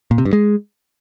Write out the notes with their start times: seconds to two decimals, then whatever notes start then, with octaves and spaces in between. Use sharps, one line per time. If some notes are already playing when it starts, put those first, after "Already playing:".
0.11 A#2
0.18 C3
0.25 G2
0.33 G#3